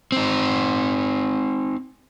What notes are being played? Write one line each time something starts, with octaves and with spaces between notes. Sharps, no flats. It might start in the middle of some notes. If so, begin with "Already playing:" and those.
C4 D#4